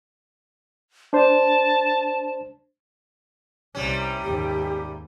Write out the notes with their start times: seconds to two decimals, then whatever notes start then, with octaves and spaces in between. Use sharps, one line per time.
1.13 D4 C5 A5
3.75 C2 C3 G3 C#4
4.23 D#2 G#2 G4